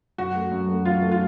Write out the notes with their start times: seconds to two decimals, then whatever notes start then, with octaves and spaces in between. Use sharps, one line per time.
0.18 F#2 F#4
0.35 A3
0.51 F#2
0.68 A3
0.85 F#3 F4
1.03 A3
1.12 F4